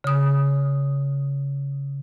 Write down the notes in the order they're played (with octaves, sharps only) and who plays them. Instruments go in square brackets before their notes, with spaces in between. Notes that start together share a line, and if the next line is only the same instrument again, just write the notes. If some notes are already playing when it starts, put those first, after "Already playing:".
[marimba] C#3 D#6